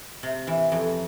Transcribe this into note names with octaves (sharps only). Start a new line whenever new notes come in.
C3
E3
F2